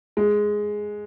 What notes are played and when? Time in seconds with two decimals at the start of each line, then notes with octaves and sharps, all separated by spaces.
0.17 G#3